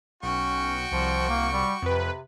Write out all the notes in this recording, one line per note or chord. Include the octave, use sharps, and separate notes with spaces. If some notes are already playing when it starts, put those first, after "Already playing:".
B1 C#4 F#4 G5 C#6
C2 F3
A#3
G3
F2 C3 B4